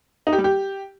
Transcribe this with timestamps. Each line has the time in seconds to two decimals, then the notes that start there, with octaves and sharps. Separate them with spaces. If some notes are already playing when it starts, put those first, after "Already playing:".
0.27 D#4
0.33 G4
0.38 G3
0.44 G4